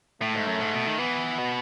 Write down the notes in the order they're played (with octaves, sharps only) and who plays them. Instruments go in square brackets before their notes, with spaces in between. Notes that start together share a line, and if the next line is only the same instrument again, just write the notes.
[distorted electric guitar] A2 [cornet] A3
[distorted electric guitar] G#2
F#2
G#2
B2
D#3
[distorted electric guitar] E3 [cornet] B3
[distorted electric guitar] B2